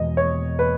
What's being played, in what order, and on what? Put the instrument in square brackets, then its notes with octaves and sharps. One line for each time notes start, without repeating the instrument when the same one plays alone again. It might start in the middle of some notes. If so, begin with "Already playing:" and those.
Already playing: [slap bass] E2 B2 G#3 [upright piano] D#5
[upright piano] C#5
B4